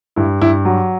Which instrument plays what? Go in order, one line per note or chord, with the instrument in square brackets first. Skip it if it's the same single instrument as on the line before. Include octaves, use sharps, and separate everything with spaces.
[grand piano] G2 E4
G2 E4
F#3